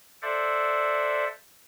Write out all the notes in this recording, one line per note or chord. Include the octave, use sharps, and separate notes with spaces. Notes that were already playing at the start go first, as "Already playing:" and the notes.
A4 C5 D5 E5 F#5